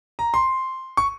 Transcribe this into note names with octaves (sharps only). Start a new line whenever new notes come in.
A#5
C6
C#6